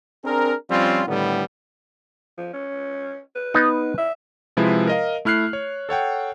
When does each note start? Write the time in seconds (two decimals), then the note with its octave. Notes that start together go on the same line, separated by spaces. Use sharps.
0.23 C4 D4 G#4 A#4
0.70 F3 G3 C4 C#4 F4
1.07 A2 D3 D#3 G3 B3
2.38 F3
2.53 C#4
3.35 B4
3.54 B3 D#4
3.98 E5
4.57 C3 F3 G#3 E4 B4
4.87 A#4 D#5 F5
5.25 A3 E4 F6 F#6 C7
5.53 C#5
5.89 A4 C#5 F#5 G5